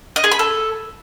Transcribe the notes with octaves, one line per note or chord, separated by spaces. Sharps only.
D#5
G#4
B5
A4